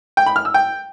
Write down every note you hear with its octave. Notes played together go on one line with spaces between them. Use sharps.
G5
B5
F6
E6
G5